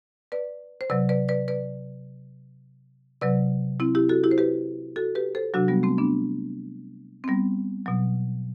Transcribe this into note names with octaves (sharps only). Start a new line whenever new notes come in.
B4 D5
C5
C3 F#3 B4 D5
B4 D5
B4 D5
B4 D5
C3 F#3 B4 D5
C4 E4
E4 G4
F#4 A4
E4 G4
C5
G4 B4
F#4 A4
G4 B4
A4 C5
C3 F#3 D4 F#4
G3 B3
A3 C4
B3 D4
C4
G3 B3
B2 F#3